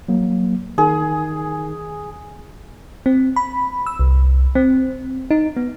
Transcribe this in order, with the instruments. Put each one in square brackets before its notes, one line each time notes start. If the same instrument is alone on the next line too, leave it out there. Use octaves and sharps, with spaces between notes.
[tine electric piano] F#3 A#3
[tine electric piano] D#3 [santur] G#4
[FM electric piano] C4
B5
E6
C2
C4
D#4
B3